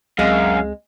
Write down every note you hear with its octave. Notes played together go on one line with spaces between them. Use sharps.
C#2 F#2 G#3 C4 F5